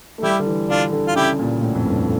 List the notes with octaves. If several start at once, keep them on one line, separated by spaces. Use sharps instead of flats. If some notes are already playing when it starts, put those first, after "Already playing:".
A3
G3 E4 G4
D3
E3
D3 D4 F4
D3
F4
C#3 E4 G4
A#2
A2
F2
G2